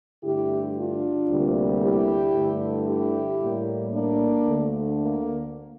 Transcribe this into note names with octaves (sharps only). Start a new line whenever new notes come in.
G2 D3 A3 E4 G4
D4 F4
D2 C3 G3 A#3
E4 G4
G2 D3 A3
E4 G4
A2 G3 A#3
A#3 D4
D2 D3 A3
A#3